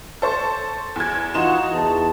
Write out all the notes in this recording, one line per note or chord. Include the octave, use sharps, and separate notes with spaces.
A4 C5 C#6
E2 G#6
E3 D#4 F4 F#4 C6 E7
E2 A5